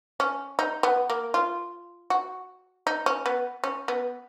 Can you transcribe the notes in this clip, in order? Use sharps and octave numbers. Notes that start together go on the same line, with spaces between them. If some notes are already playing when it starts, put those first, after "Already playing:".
C#4
D#4
B3
A#3
F4
F#4
D#4
C#4
B3
C#4
B3